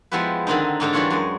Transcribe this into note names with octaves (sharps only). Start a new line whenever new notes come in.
F3 G#3 B3 E4 G4 B4
D3 D#3 C4 D#4
G#2 D3 D#4 A#5
E3 G3 D4 F4 C#5 F#5
F#2 G#3 D#5